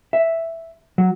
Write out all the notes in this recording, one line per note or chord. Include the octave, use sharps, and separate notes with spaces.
E5
F#3